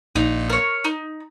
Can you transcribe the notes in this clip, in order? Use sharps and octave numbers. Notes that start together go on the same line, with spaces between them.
A#1 A#2 D#4
A#4 C#5
D#4